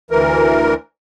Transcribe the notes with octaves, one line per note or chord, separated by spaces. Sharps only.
D2 E3 A#4